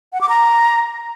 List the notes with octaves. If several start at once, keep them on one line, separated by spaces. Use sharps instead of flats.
F#5
D6
A#5